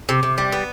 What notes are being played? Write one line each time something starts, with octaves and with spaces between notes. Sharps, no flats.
C3
C3
G3
B3